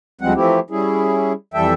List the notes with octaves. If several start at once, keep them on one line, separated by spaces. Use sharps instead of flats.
D2 F3 G3 G#3 C4 F#5
E3 F3 A3 C4 E4 G4
G3 C#4 E4 G#4
F2 E3 G3 A4 E5 G5